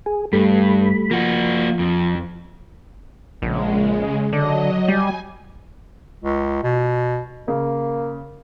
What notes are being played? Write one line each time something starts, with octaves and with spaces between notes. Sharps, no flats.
G#4
G2 G3 A3 B5
F3 A#3 F#4
F2
A#1 C#3 G#3
D3 F#3 D#5
G3 G#5
C#2
B2
C#3 A#3